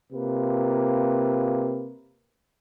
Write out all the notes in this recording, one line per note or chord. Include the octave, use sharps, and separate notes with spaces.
C3 A#3 F4 B4